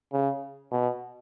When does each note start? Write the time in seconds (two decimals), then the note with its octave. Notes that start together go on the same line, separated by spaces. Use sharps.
0.13 C#3
0.71 B2